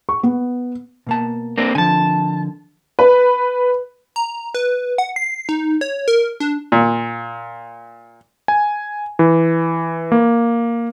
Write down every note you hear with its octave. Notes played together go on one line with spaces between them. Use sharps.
C#6
B3
B2 A#3 A5
A#3 C4 D4
D3 F3 G#5 A5
B4
A#5
B4
F#5
C7
D#4
C#5
A#4
D4
A#2
G#5
E3
A#3